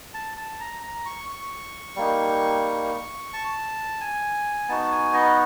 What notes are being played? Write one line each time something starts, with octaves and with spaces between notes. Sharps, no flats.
A5
A5
A#5
A#5
C#6
C#6
G3 A#3 D#4
A5
G#5
B3 D#4 F#4 A5
G#5
D#5